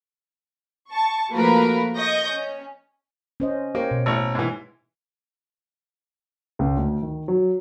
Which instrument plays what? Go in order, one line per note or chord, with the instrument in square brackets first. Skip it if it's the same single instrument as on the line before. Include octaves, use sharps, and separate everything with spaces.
[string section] A5 C#6
F3 A3 A#3 F#4 A#4 B4
D#5 C#6 G6 A#6
C#4
[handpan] C#4 C5 D#5
[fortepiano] A#3 [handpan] G4 C5 C#5
[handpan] B2
[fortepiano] A1 C#5
G#2 E3
[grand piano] C#2
D2
D#3
F#3